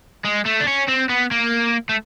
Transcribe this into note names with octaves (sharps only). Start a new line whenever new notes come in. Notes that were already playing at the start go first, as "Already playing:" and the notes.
G#3
A3
D4
C#4
C4
B3
A#3
A3